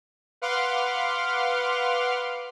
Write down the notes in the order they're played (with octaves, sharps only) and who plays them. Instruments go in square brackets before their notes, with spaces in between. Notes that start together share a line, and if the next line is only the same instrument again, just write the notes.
[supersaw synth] B4 F5 F#5 C6 D6 F6